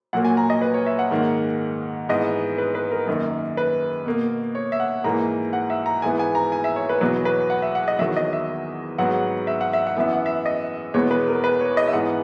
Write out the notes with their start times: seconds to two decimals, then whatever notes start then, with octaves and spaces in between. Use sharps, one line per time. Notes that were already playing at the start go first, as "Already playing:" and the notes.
0.13 A#2 F#3 A#3 F#5
0.25 G#5
0.37 A#5
0.50 D#5
0.61 B4
0.74 C#5
0.86 E5
0.99 F#5
1.11 G#2 D#3 A#3
2.09 G#2 E3 B3 D#5
2.58 B4
2.75 B4
2.92 A#4
3.07 F#2 D#3 A#3
3.57 B4
4.06 B2 A#3
4.55 C#5
4.72 E5
4.80 F#5
5.04 G#2 E3 A#3 A#5
5.53 F#5
5.70 E5
5.86 A#5
6.02 G#2 E3 B3 G#5
6.19 G#5
6.35 A#5
6.52 G#5
6.64 E5
6.76 C#5
6.89 B4
7.01 E2 B2 F#3 B4
7.25 B4
7.50 F#5
7.62 E5
7.75 F#5
7.88 D#5
7.99 E2 D#3 F#3 E5
8.17 D#5
8.33 E5
8.98 G#2 F#3 B3 F#5
9.47 E5
9.61 F#5
9.73 E5
9.87 F#5
9.97 F#2 E3 B3 E5
10.13 F#5
10.26 E5
10.46 D#5
10.94 E2 B2 G#3 B3 C#5
11.11 B4
11.28 A#4
11.44 B4
11.61 C#5
11.77 D#5
11.87 E5
11.93 G#2 E3 B3 F#5